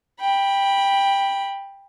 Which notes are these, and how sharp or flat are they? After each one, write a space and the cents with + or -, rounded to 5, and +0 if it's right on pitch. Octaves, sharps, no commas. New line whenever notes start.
G5 +15 B5 -10